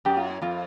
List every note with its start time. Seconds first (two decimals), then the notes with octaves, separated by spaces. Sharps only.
0.05 F#2 G4
0.17 F4
0.30 E4
0.42 F2 F4